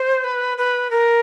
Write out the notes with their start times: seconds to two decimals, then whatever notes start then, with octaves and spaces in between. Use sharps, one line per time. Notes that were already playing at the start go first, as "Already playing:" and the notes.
Already playing: C5
0.24 B4
0.58 B4
0.91 A#4